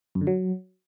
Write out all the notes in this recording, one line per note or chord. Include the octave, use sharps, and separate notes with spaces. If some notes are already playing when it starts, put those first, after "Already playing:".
F#2
D3
F#3